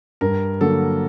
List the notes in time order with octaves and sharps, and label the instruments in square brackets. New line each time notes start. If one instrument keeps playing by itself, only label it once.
[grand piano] G2 A#4
D3 F#3 A#3 A4